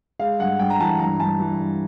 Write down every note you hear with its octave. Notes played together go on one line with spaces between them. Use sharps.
G#3 F5
G2 F#5
G2 G5
A#5
E3 A5
G2 A#5
G2 A5
E3
G2